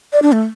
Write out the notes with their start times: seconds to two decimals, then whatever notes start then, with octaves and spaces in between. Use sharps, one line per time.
0.13 D5
0.22 D4
0.32 A3